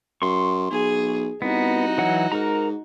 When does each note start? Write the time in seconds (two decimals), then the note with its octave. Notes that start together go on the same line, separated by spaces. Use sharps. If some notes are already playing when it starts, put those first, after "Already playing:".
0.22 F#2 C6 C#6
0.71 B1 G#4
1.42 C2 B3 D#4 F#4
1.98 E3 F#3 F#5
2.32 G#2 A#4 A#5